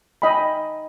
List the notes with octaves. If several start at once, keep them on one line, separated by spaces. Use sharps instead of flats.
D#4 D#5 G5 G#5 B5